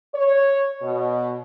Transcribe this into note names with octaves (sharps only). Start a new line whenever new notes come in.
C#5
B2